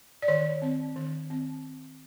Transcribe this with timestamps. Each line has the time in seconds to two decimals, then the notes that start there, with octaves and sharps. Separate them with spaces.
0.22 D5
0.28 D#3 C#5
0.62 C4
0.96 D#3
1.30 C4